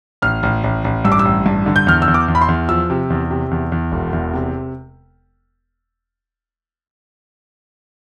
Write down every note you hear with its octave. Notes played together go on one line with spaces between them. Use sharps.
A1 F6
A1
A1
A1
G2 E6
D6
E6
A1
G2
D3
G6
E2 F6
E6
E2
D6
E2
B5
C6
E2
F3 E6
C3
E2
C3
E2
E2
E1
E2
C3